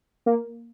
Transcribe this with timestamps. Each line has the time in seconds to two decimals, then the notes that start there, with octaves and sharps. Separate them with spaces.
0.26 A#3